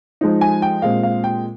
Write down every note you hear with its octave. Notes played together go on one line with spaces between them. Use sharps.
F3 G#3 D#4
G#5
G5
A#2 G#3 C4 F5
F5
G5